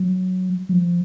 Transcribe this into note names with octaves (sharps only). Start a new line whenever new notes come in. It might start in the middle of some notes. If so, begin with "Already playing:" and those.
Already playing: F#3
F#3
F3